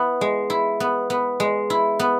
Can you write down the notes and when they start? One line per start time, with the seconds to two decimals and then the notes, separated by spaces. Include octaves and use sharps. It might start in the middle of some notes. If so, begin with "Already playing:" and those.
Already playing: B3 E4
0.21 G#3
0.50 E4
0.80 B3
1.10 B3
1.40 G#3
1.70 E4
1.99 B3